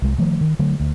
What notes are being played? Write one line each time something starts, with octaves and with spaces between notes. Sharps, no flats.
C2 G#3
D#3 F3 A3
D#3
D3 F#3 A3
D2